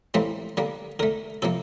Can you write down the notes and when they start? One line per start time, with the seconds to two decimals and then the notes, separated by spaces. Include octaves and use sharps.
0.14 A2 E3 G3 A#3 C4
0.57 D3 G3 A#3
0.99 D3 A3 A#4
1.42 C3 F3 A#3 A4